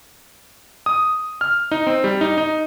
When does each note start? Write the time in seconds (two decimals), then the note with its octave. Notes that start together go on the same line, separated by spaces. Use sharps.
0.86 D#6
1.41 F6
1.71 D#4
1.87 C4
2.04 G3
2.21 D#4
2.38 D#4